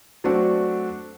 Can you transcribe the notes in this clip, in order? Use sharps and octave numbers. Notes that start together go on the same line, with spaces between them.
F#3 A3 C4 D4 F#4